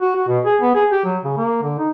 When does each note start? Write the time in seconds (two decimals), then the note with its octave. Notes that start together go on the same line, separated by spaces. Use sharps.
0.01 F#4
0.15 F#4
0.28 B2
0.45 G#4
0.61 B3
0.75 G#4
0.92 G4
1.05 F#3
1.24 C#3
1.37 A#3
1.62 D3
1.79 D#4